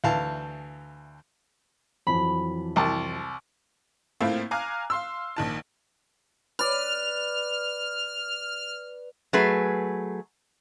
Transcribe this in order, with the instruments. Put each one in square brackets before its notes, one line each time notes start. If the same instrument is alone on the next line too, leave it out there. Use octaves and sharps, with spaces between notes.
[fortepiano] D2 E3 F5 A5
[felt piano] F2 E3 F#3 [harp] B5
[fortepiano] C2 A5
[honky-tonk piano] A2 A3 A#3 C4 E4 F4
F5 G#5 A#5 D6 F6 F#6
F5 C6 E6
A#1 D#3 A5
[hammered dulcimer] B4 D5 [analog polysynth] F6
[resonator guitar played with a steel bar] F#3 A3 G#4 B4